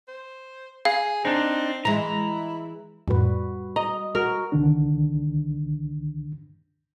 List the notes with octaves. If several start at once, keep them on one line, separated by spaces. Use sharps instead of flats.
C5
G#4 F5
C4 D4 D#4
E3 G#3 E4 A#5
F2 A2 G3 F#4 B4
D#5 A#5
F#4 A#4
C2 D3 D#3 D4